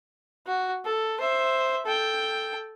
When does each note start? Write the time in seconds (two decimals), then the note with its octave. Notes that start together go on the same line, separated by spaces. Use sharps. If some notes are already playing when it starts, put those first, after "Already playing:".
0.47 F#4
0.85 A4
1.20 C5 E5
1.86 A4 G5